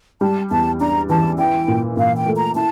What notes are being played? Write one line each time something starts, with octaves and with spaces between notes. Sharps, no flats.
G3 A5
E2 A5
D4 A#5
E3 A5
E4 G5
A#2
A#2 F5
G5
A3
A#5
E4 A5